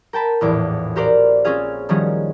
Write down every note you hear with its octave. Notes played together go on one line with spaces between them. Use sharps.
A#4 G5 A5 B5
A#1 E2 A2 D6
F#4 G4 A#4 C5 D5 F5
C4 C#4 F4 G#4 F5
D#3 F3 G3 C#4 F#4 G#4